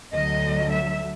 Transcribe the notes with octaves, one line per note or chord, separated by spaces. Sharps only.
D2 D3 F#3 D#5
E5